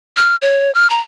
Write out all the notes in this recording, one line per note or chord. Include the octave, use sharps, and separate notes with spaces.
F6
C#5
F6
A#5